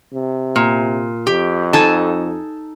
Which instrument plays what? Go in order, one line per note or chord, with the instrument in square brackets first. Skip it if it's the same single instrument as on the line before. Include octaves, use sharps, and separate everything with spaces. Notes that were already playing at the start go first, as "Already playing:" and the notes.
[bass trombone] C3
[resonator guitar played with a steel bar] A#2
[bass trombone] F2 [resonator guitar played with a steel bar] G4
[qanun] D#4 A4 G#5 [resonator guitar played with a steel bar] A5